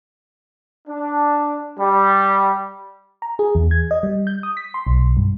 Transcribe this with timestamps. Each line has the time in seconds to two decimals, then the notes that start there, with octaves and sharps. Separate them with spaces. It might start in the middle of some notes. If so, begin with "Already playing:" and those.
0.88 D4
1.79 G3
3.22 A#5
3.39 G#4
3.55 E2
3.71 G#6
3.91 D#5
4.03 G3
4.27 G6
4.43 D#6
4.57 B6
4.74 C6
4.87 B1
5.17 G2